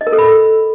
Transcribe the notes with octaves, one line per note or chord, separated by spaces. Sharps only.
D#5
A#4
A4
B5